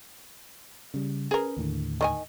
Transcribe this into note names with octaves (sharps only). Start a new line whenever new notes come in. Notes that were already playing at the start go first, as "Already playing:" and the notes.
C#3 G3
C#4 G#4 A#4 B4
D#2 A2 D3
D#3 D#5 G#5